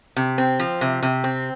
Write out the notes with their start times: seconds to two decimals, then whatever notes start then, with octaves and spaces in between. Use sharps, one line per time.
0.17 C3
0.38 C4
0.59 F3
0.81 C3
1.03 C3
1.24 C4